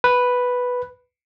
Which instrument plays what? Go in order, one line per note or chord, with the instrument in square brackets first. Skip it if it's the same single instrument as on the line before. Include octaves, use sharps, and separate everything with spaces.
[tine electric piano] B4